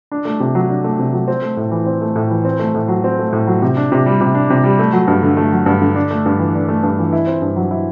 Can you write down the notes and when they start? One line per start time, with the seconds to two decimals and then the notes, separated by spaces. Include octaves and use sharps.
0.12 D4
0.25 A3
0.40 C3
0.55 F#3
0.70 D4
0.84 A3
0.99 C3
1.13 F#3
1.28 C4
1.42 A3
1.57 A2
1.71 E3
1.86 C4
2.01 A3
2.16 A2
2.31 E3
2.45 C4
2.59 A3
2.74 A2
2.88 F#3
3.04 C4
3.19 A3
3.33 A2
3.47 F#3
3.62 C3
3.77 D4
3.92 C3
4.06 G3
4.21 C3
4.34 D4
4.50 C3
4.64 G3
4.79 A3
4.93 F#3
5.08 G2
5.23 D3
5.37 A3
5.53 F#3
5.66 G2
5.82 D3
5.95 D4
6.11 A3
6.26 G2
6.39 E3
6.55 D4
6.68 A3
6.83 G2
6.99 E3
7.13 E4
7.27 C4
7.42 G2
7.56 F#3
7.71 E4